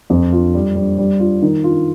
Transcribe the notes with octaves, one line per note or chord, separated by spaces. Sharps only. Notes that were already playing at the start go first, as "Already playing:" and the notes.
F2
F4
G3
G3
G3
F4
D#3
F4